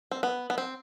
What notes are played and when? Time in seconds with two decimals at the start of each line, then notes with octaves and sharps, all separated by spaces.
0.11 C4
0.23 B3
0.50 B3
0.58 C4